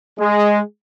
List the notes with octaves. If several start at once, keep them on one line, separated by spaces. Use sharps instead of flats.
G#3